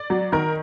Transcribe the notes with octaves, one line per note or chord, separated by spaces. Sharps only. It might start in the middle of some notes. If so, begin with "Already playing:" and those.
Already playing: D5
F#3
D#3 A#4